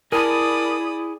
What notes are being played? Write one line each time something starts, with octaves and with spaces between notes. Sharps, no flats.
E4 G#4 A#4 D5 A5 B5 D#6